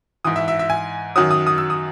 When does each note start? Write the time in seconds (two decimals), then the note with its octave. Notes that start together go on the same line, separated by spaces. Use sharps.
0.25 G#2 E3 D#6
0.36 E5
0.48 E5
0.59 E5
0.70 G#5
1.16 F#2 D#3 F#3 D#6
1.31 D#6
1.47 D#6
1.58 E6
1.70 D#6